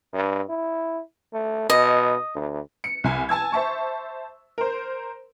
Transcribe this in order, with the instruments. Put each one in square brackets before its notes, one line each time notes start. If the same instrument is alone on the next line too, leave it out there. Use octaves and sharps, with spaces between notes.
[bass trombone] G2
E4
A3
[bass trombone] B2 [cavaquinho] D#5
[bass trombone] D2
[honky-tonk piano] C#7
C2 G#5
G#5 A5 E6 G#6
C5 E5 A5 C#6
A#4 C5